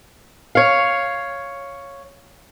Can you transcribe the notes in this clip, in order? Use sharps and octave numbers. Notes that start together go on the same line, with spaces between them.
C#5 F5